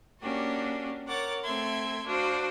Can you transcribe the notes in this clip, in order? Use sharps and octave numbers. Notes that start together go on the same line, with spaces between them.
A#3 C#4 D4 F#4 G4
A#4 C#5 F#5 D6 A6
A3 C4 A4 E5 C6 G#6
D4 F#4 C5 F5